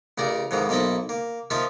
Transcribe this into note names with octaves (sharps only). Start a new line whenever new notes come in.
A1 C#3 A#4 D5 A#5
F2 G#2 D#3 E3 A#5
B1 A#3 C4 E4 A4 D#5
A#3
F3 A#3 D#4 F4 C5 E5